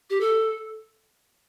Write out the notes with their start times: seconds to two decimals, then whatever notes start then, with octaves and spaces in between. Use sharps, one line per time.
0.10 G4
0.21 A4